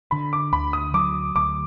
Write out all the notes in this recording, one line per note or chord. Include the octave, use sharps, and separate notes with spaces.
D3 B5
D6
D2 B5
D#6
F#3 D6
D2 D6